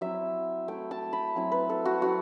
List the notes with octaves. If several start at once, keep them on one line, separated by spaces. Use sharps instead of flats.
F#3 C4 E4 E5
A3 E4 G5
A5
B5
F#3 C4 E4
B4
A4
F#4
F#3 C4 E4 F#4